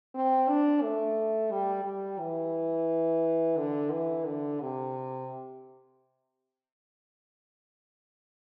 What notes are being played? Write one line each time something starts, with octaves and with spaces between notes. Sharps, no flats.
C4
D4
A3
G3
G3
E3
D3
E3
D3
C3